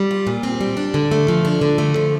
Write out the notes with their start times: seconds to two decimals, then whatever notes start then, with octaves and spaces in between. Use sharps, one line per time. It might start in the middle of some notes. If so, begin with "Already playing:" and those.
Already playing: G3
0.11 F4
0.27 A#2
0.43 C4
0.61 G3
0.77 D4
0.94 D3
1.11 A3
1.28 F3
1.45 D4
1.61 D3
1.78 A3
1.96 F3